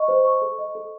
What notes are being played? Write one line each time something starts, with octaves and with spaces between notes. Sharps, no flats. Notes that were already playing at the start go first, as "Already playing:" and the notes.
Already playing: D#5 C#6
C5
C#6
A4
D#5
A4